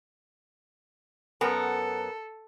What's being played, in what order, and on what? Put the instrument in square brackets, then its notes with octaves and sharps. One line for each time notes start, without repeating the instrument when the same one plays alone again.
[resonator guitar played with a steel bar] F#2 B3 A#4 [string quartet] A4